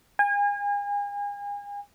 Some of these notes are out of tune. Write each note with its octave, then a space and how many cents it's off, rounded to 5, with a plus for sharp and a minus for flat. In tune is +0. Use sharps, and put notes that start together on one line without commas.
G#5 -35